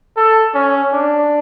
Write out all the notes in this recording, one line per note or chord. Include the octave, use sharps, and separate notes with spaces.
A4
C#4
D4